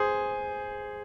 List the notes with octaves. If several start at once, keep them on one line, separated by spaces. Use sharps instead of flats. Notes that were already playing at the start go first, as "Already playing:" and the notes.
Already playing: G#4 C5